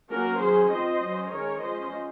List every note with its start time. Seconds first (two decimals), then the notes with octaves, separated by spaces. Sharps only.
0.10 F#3 A#3 C#4 F#4 A#4
0.40 D#3 F#3 C#4 G#4 C5
0.70 F3 C4 C5 D#5
1.01 F#3 C#4
1.30 D#3 G#3 C#4 A#4 C#5
1.60 F3 G#3 C#4 C5 D#5